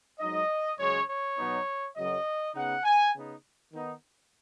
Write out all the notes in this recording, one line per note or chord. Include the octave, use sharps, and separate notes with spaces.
G#2 F#3 D#4 D#5
F#2 C#3 G#3 C#5
C#5
B2 F#3 B3 D#4
F#2 C#3 F#3 D#5
C#3 B3 D#4 F#5
G#5
C#3 B3 D#4
D#3 B3 D#4